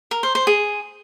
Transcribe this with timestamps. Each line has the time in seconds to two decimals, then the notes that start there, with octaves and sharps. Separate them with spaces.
0.11 A#4
0.23 C5
0.35 C5
0.47 G#4